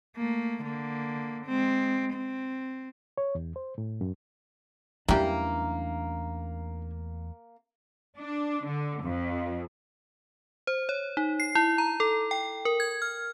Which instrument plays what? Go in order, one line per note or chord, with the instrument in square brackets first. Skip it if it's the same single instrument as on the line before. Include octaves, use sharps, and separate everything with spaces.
[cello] A3 A#3
D3 A#3
G#3 C4
C4
[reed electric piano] C#5
E2
C5
A2
F#2
[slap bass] E2 F#3 A3 [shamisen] E3 G3 [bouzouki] A#3 [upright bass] C#4 D4
[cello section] D4
D3
F2
[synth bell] C5
C#5
D#4
C7
E4
A#5
A4
G5
A#4
G#6
F6